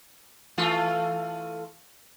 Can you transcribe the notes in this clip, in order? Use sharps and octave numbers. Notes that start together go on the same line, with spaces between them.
E3 A3 F4